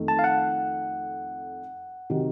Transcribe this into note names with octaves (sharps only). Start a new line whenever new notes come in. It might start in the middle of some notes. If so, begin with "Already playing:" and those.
Already playing: F2 D#3 A3 D#4
A5
F5
F#5
C3 D#3 F#3